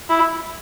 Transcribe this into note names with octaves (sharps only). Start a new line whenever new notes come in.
E4